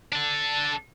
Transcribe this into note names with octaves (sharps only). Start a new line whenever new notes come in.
D4 A4